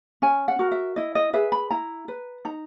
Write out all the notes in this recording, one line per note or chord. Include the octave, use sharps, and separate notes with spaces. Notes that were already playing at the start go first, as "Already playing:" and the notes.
C#4 G#5
F#5
F#4 A#4
E5
E4 D#5
D#5
G#4 B4 E5
B5
E4 A#5
B4
D#4 A#5